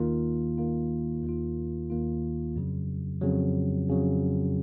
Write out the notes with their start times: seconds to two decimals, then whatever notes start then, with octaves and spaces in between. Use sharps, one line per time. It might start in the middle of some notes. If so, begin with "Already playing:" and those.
Already playing: D#2 D#3 A#3 F4
0.58 D#2 D#3 A#3 F4
1.24 D#2 D#3 A#3 F4
1.90 D#2 D#3 A#3 F4
2.56 F2 C#3 F#3
3.21 F2 C#3 F#3
3.88 F2 C#3 F#3